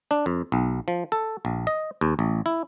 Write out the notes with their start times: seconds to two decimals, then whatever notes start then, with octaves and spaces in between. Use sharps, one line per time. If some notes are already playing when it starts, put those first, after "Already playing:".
0.11 D4
0.26 F2
0.52 B1
0.88 F3
1.12 A4
1.45 A#1
1.67 D#5
2.01 D#2
2.19 A1
2.46 E4